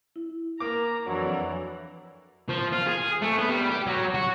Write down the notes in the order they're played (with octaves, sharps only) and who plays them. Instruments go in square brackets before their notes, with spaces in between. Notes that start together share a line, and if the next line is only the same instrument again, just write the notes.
[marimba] E4
[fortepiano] A#3 D6 [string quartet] A#5
[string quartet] F2 E3 D4 [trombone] F#3
[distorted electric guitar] F3
F4
G#4
A3
B3
G3
G4
F#3
F#4